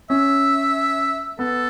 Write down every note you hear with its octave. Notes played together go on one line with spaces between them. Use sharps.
C#4 E5
B3 A4